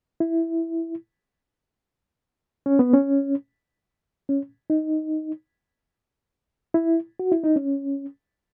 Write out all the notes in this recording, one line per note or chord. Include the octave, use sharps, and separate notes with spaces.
E4
C#4
B3
C#4
C#4
D#4
E4
F#4
E4
D#4
C#4